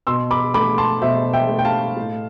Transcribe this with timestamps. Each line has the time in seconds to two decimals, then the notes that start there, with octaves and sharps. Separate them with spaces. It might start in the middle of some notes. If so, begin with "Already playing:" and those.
0.07 B2 C6 E6
0.31 B5 D6
0.54 A3 B5 D6
0.78 A5 C6
1.01 B2 C5 E5
1.33 E5 G5
1.49 A3
1.59 G5
1.65 F5 A5
1.96 A2